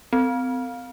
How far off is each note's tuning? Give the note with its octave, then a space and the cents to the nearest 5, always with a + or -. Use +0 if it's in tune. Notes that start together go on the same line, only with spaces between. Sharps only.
C4 -35